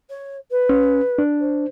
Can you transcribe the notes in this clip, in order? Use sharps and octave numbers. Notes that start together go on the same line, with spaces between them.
C#5
B4
C#4
D4
C5